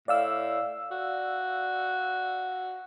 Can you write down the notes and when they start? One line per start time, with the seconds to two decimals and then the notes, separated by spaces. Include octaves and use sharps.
0.08 A2 D5 F5 E6
0.91 F#4